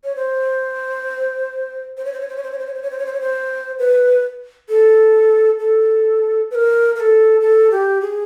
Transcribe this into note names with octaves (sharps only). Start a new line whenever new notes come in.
C#5
C5
C5
C#5
C5
C#5
C5
C#5
C5
C#5
C5
C#5
C5
C#5
C5
C#5
C5
C#5
C5
B4
A4
A4
B4
A#4
A#4
A4
A4
G4
G#4